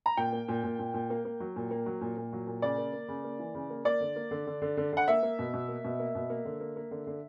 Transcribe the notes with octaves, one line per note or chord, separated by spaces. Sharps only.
A#5
A#2 G5
A#3
A#2
A#2
A#2
A#2
A#3
A#3
F#3
A#2
A#3
F#3
A#2
A#2
F#3
A#2
C#3 D5
A#3
A#3
C#3
A#3
E3
C#3
A#3
A#3 D5
D3
A#3
D3
D3
D3
D3
D3 F#5
A#3 E5
A#3
B2
B2
A#3
B2
A#3
B2
A#3
D3
A#3
A#3
D3
D3